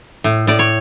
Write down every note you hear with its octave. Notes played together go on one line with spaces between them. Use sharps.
A2
A2 D5
C#5